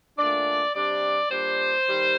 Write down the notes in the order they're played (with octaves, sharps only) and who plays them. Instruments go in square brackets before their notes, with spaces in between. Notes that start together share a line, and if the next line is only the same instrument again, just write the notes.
[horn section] A#2 A3 D4 D5
C3 G3 D4 D5
A#2 G3 D4 C5
D#3 G3